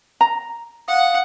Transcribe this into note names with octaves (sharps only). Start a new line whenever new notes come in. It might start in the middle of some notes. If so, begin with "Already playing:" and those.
A#5
F5 F#5 D#6